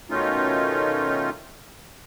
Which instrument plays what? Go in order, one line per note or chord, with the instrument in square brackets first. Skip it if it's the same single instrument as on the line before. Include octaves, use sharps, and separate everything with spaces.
[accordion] B2 D#3 A3 C#4 D#4 F4